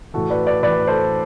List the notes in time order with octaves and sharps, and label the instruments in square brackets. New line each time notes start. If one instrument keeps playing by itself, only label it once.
[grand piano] A2 E3 F#4 A4
B4 D5
B4 D5
A2 E3 B4 D5
A4 C5